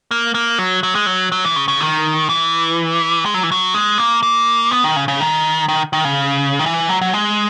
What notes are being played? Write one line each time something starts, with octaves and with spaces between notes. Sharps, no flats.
A#3
A#3
F#3
F#3
G#3
F#3
F#3
E3
C#3
C#3
D#3
E3
G#3
F#3
E3
F#3
G#3
A#3
A#3
B3
D#3
C#3
C#3
D#3
D#3
D#3
C#3
D#3
E3
F#3
F#3
G#3